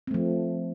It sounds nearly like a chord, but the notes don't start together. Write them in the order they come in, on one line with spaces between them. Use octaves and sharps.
C4 A3 F3